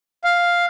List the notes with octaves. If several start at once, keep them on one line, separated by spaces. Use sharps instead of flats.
F5